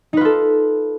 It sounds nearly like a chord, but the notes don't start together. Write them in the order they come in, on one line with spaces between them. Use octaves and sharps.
D#4 B4 F4 A4